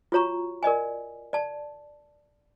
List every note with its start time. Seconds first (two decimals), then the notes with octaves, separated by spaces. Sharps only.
0.12 F4 F#4 C#5 A#5 C#6
0.63 A#4 D5 D#5 G#5
1.33 D5 A5